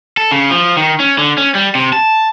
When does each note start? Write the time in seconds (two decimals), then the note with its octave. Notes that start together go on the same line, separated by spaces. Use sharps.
0.17 A4
0.31 C#3
0.51 F3
0.77 D#3
1.00 C#4
1.18 D3
1.38 C#4
1.55 G3
1.75 C3
1.93 A5